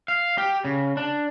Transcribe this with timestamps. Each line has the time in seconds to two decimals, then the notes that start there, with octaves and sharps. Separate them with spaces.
0.08 F5
0.38 G4
0.65 C#3
0.97 D4